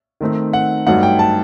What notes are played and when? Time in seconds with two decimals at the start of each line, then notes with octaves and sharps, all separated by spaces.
0.21 D#3 A3 C4 D#4
0.53 F#5
0.87 G2 F#3 A3 D#4 F#5
1.03 G5
1.19 A5